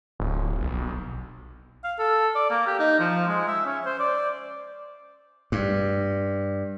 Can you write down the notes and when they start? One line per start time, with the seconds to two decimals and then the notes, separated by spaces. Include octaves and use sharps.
0.19 D1
0.60 B1
1.84 F5
1.99 A4
2.35 D5
2.50 A#3
2.67 G4
2.79 D#4
3.00 F3
3.28 G#3
3.48 E5
3.66 C#4
3.86 C5
4.00 D5
5.52 G2